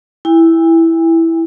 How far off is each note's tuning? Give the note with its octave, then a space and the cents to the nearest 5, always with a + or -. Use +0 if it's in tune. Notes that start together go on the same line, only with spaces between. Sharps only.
E4 +0 G#5 -45